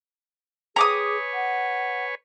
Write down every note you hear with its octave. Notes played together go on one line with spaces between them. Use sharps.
G#4 B4 C#5 G#5 A#5 D6 D#6
F#5